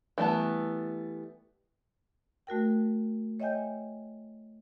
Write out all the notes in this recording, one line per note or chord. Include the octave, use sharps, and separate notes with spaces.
E3 G3 A3 B3 A5
A3 F#4 A#4 G5
C#5 D#5 E5 G5 G#5 G6